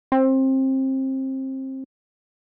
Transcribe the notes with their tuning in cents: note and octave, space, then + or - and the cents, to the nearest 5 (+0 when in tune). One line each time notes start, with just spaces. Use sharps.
C4 +25